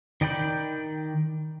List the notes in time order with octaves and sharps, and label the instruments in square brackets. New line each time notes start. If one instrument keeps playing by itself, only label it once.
[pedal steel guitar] D#3 D5 G5 B5 G6